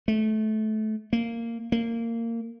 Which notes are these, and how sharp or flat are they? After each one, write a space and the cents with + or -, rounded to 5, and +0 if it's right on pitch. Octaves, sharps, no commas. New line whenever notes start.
A3 -20
A#3 -15
A#3 -20